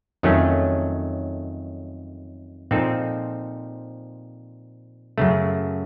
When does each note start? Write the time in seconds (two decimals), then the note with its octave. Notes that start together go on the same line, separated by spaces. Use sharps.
0.23 F2 D#3 F#3 A3 C#4
2.71 A#2 F3 C4 D#4 A4
5.18 F#2 C#3 A3